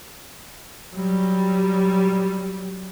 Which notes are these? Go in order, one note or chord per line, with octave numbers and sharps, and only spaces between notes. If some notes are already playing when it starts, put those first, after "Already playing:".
F#3 G3